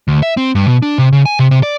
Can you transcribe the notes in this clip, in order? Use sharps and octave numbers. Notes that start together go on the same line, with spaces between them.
D2
E5
C4
G2
B2
D4
C3
C#3
G#5
C3
C3
D5